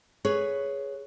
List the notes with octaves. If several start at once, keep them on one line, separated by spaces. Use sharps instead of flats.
G#4 B4 C#5